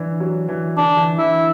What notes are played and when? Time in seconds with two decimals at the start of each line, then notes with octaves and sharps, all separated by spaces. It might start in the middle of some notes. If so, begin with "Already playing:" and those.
Already playing: E3 D4
0.20 F#3
0.49 E3
0.77 D3 D4
0.97 E3
1.18 E3 E4